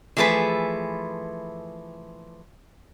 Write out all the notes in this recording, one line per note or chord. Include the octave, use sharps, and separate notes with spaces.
E3 F3 A3 G#4 B4